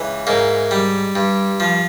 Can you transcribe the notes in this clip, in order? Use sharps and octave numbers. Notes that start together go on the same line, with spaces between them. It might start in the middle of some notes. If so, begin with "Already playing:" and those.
Already playing: C#2 E3
G#2 A#3
G3
G2
F3